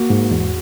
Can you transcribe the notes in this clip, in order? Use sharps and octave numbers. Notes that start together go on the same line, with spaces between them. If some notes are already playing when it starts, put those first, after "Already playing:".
Already playing: A#3 F#4
G#2
E2